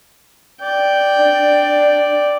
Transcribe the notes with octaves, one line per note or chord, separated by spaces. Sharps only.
D5 G5
D4